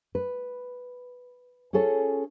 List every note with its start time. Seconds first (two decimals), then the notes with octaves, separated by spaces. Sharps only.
0.15 B4
1.73 C#4 F4 G#4 A4 C#5